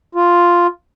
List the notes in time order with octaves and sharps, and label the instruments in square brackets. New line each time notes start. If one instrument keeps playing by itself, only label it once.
[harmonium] F4